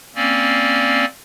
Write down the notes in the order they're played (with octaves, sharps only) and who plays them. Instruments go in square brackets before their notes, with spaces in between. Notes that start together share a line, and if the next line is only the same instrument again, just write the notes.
[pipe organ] A#3 C4 C#4 D5